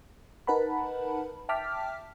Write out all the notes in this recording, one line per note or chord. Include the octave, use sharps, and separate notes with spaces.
D#4 A#4 B4 F#5 A5 B5
E5 G5 A5 D6 F6 B6